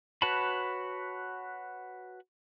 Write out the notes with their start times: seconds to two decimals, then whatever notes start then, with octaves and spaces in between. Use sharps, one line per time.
0.22 F#4 B4 C#5 A5 B5